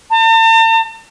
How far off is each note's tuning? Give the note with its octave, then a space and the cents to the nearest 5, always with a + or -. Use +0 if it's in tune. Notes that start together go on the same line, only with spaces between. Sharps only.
A5 +45